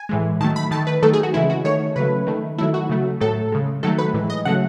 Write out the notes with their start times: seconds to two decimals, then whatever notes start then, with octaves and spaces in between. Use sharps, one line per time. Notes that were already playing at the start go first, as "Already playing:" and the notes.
Already playing: G#5
0.09 A2 E3 G#3
0.41 D#3 F#3 A3 A5
0.56 B5
0.71 D#3 A3 A5
0.87 B4
1.02 D#3 F#3 A3 A4
1.13 G#4
1.23 F#4
1.34 C#3 E3 G#3 E4
1.50 F#4
1.65 D#3 A3 C#5
1.96 C#3 F#3 A3 B4
2.27 D#3 A3
2.58 D#3 F#3 A3 E4
2.74 F#4
2.89 C#3 F#3 A3
3.21 A2 F#3 A3 A4
3.52 C#3 G#3
3.83 D#3 F#3 A3 A4
3.98 B4
4.14 A2 E3 G#3
4.30 D#5
4.45 C#3 F#3 A3 F#5